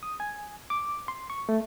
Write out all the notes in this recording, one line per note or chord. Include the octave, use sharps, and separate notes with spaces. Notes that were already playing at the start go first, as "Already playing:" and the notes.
D#6
G#5
D6
C6
C#6
A3